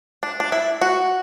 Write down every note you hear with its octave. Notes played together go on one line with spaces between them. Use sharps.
D4
D4
E4
F#4